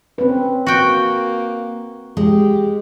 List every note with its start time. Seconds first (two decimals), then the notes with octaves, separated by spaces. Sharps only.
0.18 C4 C#4 B4
0.66 A#3 F#4 G5
2.17 G#3 G4